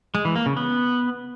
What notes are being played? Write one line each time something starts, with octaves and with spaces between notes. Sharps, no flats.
G#3
E3
A#3
C#3
B3